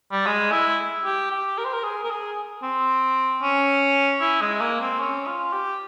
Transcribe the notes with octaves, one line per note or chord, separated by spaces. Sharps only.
G3
G#3
E4
G4
G4
A#4
C5
A#4
G#4
A#4
G#4
C4
C#4
E4
G#3
A#3
C4
C#4
F4
G4